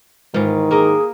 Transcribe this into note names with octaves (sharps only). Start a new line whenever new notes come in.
G#2 D#3 E3 F4
A#3 G#4 A#4 D#5